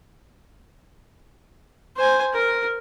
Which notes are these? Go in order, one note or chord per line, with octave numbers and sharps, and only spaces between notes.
C5 G#5
A#4